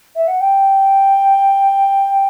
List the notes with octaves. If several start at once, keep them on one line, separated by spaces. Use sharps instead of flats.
E5
F#5
G5